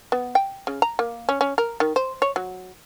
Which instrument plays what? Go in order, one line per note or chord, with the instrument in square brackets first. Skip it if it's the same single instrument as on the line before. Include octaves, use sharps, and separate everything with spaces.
[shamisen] B3
G5
C#3
A#5
A#3
C#4
C#4
A#4
D#3
C5
C#5
F#3